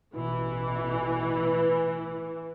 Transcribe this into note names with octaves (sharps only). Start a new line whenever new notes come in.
A1 B2 E3